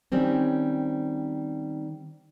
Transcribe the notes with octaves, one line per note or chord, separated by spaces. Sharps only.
D#3 G3 C4 C#4